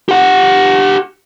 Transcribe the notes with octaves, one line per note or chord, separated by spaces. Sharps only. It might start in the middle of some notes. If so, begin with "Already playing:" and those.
G4 F#5